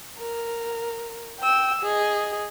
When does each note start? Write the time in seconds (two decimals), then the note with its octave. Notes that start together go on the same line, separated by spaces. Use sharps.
0.19 A#4
1.40 G5 E6
1.82 G#4 D#5